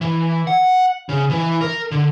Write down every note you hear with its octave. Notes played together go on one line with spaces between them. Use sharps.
E3
F#5
C#3
E3
A#4
D3